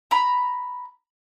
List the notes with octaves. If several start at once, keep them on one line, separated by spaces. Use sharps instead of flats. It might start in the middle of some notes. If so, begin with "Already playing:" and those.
A#5 B5